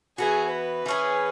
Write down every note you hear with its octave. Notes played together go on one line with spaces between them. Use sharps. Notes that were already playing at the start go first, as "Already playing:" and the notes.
E3 B3 F#4 G#4
B4
E3 C#4 G#4